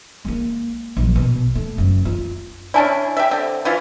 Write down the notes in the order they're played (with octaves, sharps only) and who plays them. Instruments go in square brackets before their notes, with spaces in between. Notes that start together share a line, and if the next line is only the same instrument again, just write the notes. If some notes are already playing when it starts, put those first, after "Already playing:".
[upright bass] G#3 A#3
A#1 F#3
B2
A3
F#1
F4
[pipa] C#4 D4 E4 [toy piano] D5 G#5
[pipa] G4 E5
D3 C4
E3 E4 F4